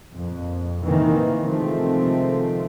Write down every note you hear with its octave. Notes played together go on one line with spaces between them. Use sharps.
F2 A#2
A2 C3 D#3 E3 A#3
C3 D#3 F3 G#3 A3 C4